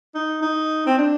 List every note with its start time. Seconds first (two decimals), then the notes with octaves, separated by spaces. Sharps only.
0.14 D#4
0.42 D#4
0.86 C4
0.98 D4